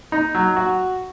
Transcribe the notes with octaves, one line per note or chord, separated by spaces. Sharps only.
D#4
F#3
F#4